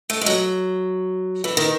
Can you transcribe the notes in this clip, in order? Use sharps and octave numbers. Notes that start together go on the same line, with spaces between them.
A3
G#3
F#3
E3
D#3